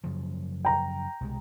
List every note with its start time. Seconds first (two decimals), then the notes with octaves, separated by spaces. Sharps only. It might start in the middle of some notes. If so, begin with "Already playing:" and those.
0.04 F#2 C#3 F3
0.65 G5 A#5
1.21 C2 B2 G#3